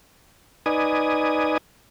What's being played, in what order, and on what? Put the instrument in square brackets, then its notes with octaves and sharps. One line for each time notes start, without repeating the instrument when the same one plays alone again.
[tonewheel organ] D#4 B4 D5 G#5 D#6